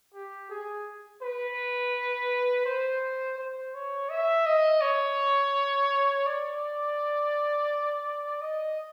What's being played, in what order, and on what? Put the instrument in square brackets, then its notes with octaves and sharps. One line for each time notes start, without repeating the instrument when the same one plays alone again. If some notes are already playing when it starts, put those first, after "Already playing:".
[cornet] G4
G#4
B4
C5
C5
C#5
E5
D#5
C#5
D5
D#5